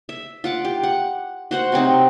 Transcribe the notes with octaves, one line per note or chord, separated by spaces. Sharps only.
E5
F4 F#5 D6
G4
F#5
F#4 C5 F#5
C3 F#3 C4 D#4